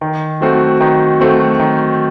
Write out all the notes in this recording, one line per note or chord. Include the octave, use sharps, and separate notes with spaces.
D#3
F#3 A3 C4 F#4
D#3
F#3 A3 C4 F#4
D#3